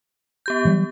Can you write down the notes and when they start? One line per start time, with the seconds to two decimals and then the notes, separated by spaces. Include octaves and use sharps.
0.46 B3 G4 G6
0.65 E3 F#3 G3